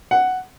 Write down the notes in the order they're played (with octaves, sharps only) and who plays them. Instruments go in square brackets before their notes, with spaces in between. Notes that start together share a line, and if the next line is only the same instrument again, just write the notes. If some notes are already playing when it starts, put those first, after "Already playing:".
[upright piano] F#5